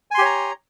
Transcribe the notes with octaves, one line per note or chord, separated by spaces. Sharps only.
G4 C#5 G#5 A#5 C6